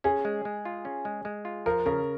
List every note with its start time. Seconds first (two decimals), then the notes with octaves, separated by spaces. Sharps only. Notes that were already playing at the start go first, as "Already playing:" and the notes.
0.04 C#4 G#4
0.25 G#3
0.45 G#3
0.65 F4
0.85 C#4
1.05 G#3
1.25 G#3
1.45 F4
1.66 F3 A#4
1.86 C#3 A#4